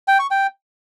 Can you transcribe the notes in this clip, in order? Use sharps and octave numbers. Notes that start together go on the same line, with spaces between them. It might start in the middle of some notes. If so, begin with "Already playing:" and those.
G5
C#6
G5